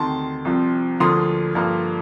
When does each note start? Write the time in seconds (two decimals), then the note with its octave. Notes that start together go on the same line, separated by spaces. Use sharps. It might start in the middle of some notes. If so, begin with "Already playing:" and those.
Already playing: D2 C3 D#3 A5 C6
0.45 C2 C3 F3 C4
1.00 D2 D3 F3 A#3 C6 D#6
1.55 G2 D3 F3 A#3